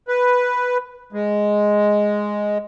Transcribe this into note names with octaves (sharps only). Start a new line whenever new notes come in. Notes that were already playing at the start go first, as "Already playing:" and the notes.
B4
G#3